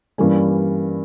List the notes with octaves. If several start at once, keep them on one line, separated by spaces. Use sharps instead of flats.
G2 E3 G3 A#3 C#4